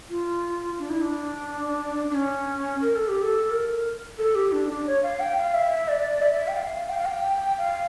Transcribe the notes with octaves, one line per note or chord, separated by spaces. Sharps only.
F4
D4
E4
D4
D4
C#4
A#4
A4
G4
A4
A#4
A4
G4
D4
D4
C#5
F5
G5
F5
E5
D5
E5
G5
F5
G5
F5
G5
F5